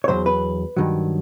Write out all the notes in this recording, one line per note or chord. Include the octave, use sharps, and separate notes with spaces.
C#5
E2 B2 F#3 C5
B4
G2 D#3 F#3